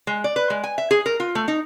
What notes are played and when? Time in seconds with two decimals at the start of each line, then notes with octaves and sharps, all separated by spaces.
0.07 G#3
0.24 D5
0.36 B4
0.50 G#3
0.64 G#5
0.78 E5
0.91 G#4
1.06 A#4
1.20 F4
1.35 A3
1.48 D#4